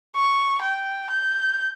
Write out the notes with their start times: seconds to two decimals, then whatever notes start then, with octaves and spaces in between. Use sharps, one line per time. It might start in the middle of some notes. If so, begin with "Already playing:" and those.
0.16 C#6
0.61 G5
1.10 G6